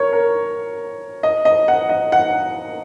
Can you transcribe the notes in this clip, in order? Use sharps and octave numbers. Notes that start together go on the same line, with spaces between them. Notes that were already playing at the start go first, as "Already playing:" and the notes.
Already playing: A#4 C#5
A#4
D#5
D#5
F#5
D#5
F#5